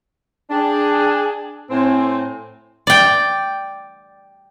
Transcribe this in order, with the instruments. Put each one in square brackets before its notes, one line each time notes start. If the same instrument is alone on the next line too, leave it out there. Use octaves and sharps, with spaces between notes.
[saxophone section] D4 [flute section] G#4 G5 A5
[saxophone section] A2 C4 [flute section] G#5
[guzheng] D5 G5